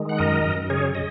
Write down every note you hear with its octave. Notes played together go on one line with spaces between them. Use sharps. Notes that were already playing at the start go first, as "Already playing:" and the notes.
Already playing: D#3 G#3
F#5
F#2 A#4 D#5
F#2
C#3 G#4 C#5
D#5